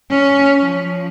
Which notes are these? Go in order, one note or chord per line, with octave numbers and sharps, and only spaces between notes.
C#4
F3